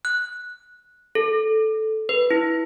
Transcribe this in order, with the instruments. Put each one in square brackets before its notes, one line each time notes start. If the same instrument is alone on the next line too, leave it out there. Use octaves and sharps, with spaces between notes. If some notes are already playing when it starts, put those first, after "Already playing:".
[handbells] F#6
A4
B4
E4